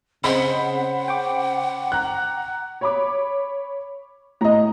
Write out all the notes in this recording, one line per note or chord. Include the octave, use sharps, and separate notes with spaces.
C#3 C4 G#4 C5 D#5 F#5 B5
G5 C#6 D6
A#5 F#6
C#5 B5 D6
A2 D#5 A#5